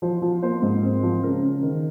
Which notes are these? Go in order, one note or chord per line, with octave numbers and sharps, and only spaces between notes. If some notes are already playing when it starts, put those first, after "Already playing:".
F3 C5
F3
A#3 C5
G#2
C4
F3
C#3 A#4
C#3
D#3